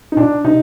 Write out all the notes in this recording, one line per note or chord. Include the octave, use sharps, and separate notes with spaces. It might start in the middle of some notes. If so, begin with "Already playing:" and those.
D#4
A#2 D4
C3 D#4